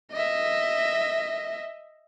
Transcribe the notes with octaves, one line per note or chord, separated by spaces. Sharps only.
D#5 E5